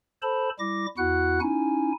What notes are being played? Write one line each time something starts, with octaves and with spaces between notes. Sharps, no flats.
A4 C5 A5 B5
G3 E4 D6 A#6
E2 E4 F#4 F#5 F#6
C#4 D#4 E4 G#5